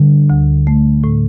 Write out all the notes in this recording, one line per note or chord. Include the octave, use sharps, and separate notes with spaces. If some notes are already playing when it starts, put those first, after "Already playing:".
Already playing: D3 G3
D2
A3
A2